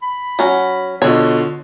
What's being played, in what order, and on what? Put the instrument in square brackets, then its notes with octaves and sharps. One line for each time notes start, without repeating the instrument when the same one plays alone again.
[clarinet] B5
[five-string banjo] F#3 C#4
[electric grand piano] B2 D3 D#5 [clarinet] F4 [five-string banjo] C#5